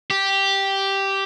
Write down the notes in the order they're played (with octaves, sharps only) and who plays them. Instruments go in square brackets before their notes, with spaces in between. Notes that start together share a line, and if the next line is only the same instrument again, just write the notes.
[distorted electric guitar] G4